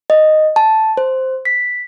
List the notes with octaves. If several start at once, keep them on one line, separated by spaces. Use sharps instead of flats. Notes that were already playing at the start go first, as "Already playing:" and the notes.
D#5
A5
C5
B6